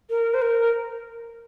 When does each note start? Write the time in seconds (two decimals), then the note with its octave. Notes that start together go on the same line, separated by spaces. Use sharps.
0.10 A#4
0.34 C5
0.42 A#4